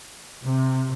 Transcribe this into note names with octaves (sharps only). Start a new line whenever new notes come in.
C3